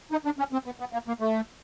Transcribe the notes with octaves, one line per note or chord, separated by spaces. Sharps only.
D#4
D4
C#4
C4
B3
B3
A#3
A#3
A3